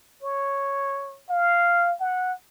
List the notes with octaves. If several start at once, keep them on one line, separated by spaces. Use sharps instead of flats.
C#5
F5
F#5